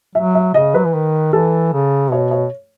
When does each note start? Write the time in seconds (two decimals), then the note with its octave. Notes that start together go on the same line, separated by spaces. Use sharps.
0.15 F#3 E5
0.35 E5
0.54 C#3 D#5
0.74 F#3 B4
0.86 E3
0.94 D#3
1.33 E3 A4
1.73 C#3
2.11 B2 C#5
2.31 C#5